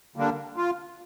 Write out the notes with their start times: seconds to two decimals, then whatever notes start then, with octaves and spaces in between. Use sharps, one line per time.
0.16 D3 G3 A#3 D4
0.57 F4